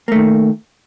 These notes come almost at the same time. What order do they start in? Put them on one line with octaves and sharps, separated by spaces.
A#3 A3 D#3